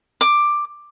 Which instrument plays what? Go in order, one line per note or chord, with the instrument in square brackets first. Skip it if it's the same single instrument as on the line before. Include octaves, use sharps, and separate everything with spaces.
[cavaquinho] D6